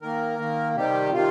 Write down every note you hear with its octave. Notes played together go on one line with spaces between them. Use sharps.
D#3 A#3 A#4
D#3 A#3
C3 D#3 G3 G4
C3 D#3 G3 F4